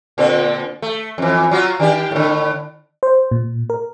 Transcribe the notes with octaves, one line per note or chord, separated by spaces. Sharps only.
A#2 D3 C4
A3
F2 E3
F#3 F4 F#4
D#3 D4 G4
A2 D3
C5
A#2
A#4